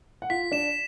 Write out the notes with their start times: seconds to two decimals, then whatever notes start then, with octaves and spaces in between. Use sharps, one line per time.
0.22 F#5
0.30 F4 F5 B6
0.52 D4 D5 E7